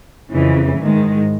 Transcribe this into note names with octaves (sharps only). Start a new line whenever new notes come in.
F2 C#3 E3
G#2 D#3 G#3